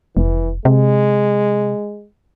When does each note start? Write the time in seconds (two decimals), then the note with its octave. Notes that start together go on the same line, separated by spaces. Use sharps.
0.17 F1 E3
0.65 C3 G#3